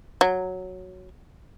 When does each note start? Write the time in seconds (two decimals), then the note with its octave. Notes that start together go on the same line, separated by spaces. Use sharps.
0.21 F#3